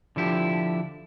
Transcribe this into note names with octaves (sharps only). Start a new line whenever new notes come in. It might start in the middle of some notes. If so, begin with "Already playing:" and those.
D3 F3 E4 G4